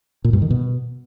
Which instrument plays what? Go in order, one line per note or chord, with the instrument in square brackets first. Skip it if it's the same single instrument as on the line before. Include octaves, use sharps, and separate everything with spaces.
[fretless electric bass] A#2
G2
D#3
B2